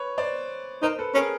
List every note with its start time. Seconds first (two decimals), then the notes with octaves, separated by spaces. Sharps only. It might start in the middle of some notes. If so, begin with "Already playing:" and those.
Already playing: B4 C#5
0.18 C5 D5
0.82 D#4 A#4 C5
0.98 A4 B4
1.15 C#4 G#4 A#4